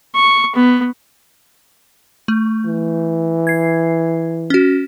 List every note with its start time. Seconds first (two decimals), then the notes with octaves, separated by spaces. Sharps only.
0.14 C#6
0.55 B3
2.28 A3
2.65 E3
3.47 G#6 C7
4.50 C#4 F#4